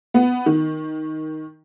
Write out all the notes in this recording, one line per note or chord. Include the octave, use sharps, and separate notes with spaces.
B3
D#3